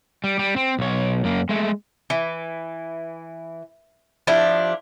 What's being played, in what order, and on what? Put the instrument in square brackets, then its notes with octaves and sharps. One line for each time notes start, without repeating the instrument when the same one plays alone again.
[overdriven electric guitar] G3
G3
C4
B1 C#5
F#2 A#3
G#3 A3
[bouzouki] E3
F3 D4 E4 G4